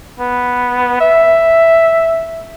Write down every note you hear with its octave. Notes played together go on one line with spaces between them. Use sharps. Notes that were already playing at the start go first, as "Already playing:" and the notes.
B3
E5